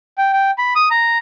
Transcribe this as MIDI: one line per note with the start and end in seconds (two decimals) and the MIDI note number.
0.18 0.32 79
0.33 0.51 79
0.58 0.74 83
0.76 0.89 87
0.91 1.18 82